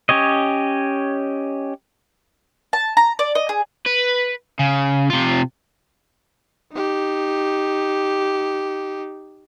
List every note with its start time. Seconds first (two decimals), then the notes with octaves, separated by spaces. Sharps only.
0.09 C#4 G4 C#5 D#5
2.73 A5
2.97 A#5
3.19 D5
3.35 D#5
3.49 G#4
3.86 B4
4.59 C#3
5.10 C3 F4
6.73 D#4 G4